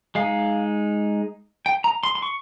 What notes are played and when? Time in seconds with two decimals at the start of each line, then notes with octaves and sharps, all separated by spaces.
0.15 G#3 D#4 F5
1.66 G5
1.84 A#5
2.03 C6
2.15 C6
2.22 C#6